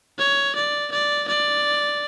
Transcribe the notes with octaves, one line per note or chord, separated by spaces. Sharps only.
C#5
D5
D5
D5